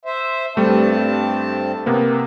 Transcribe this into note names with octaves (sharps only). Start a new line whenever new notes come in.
C5 E5
G2 G3 A3 C4 A5
C3 A#3 B3